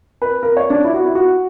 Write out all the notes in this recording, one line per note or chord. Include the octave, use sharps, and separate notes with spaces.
B4
A#4
C#5
D4
E4
F#4
E4
F#4